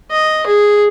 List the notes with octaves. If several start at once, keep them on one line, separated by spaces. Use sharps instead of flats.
D#5
G#4